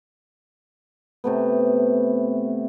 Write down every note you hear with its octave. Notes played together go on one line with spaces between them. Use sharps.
C3 A3 B3